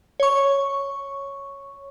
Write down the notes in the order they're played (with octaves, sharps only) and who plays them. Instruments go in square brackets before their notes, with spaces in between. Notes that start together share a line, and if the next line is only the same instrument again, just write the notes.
[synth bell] C#5 C#6